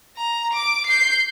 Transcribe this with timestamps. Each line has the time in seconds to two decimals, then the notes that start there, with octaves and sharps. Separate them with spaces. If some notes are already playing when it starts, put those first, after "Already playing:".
0.16 A#5
0.53 D6
0.86 G6 C7